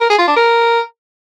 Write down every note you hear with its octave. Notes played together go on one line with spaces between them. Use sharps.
A#4
G#4
F4
D4
A#4